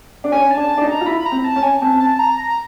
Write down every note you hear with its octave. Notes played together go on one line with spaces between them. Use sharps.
D4
C#4 G#5
A5
D4
A5
D4
D#4
A#5
F4
E4 B5
A#5
C4
A5
C#4
G#5
C4 A5
A5
A#5
A#5